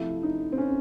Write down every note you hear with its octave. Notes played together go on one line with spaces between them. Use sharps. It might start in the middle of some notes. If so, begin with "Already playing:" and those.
Already playing: C3 F3 A3 E4
D#4
C4
C#4